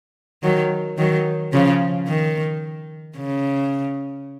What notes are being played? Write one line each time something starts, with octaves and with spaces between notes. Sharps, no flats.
D#3 F#3
D#3 F#3
C#3 F3
D#3
C#3